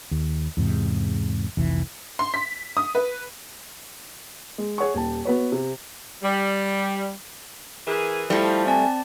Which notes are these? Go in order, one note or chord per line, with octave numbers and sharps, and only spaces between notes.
D#2
E2 G#2 C3
F1 C2 E3
C6
B6
D#6
B4
G#3
G#4 C#5 F#5 C#6
D#1 G4 A5
B3 F#4 B4 C#5
C3
G3
E3 G#4 A#4
F3 G3 A3 E4 A4
C4 D5 G#5 A5